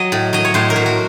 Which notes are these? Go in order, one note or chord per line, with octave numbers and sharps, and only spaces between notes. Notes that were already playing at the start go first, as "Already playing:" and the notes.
Already playing: F#3 D#5
A2
F#3 D#5
C#5
A2 C5
A#4
F#3
F#4